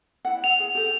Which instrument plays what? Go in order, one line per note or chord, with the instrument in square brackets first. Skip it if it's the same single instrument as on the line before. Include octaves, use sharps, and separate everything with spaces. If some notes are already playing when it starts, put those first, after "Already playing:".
[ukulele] E4 F#5
[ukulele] F#5 [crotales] F7
[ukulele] G#4
G4 A4